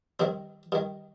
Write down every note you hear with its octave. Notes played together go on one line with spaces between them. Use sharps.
G2 D#3 C4
G2 D#3